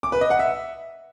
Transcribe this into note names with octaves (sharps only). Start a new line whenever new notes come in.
D6
B4
D#5
F#5
E5